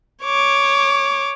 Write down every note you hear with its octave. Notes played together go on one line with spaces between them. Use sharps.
C#5 D6